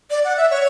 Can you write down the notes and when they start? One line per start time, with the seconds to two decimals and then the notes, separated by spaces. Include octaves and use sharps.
0.10 D5
0.24 F#5
0.37 E5
0.51 C#5